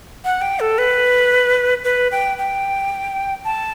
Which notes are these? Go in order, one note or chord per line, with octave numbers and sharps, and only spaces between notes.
F#5
G5
A4
B4
B4
G5
G5
A5